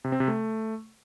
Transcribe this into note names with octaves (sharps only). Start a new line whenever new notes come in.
C3
C4
C3
A3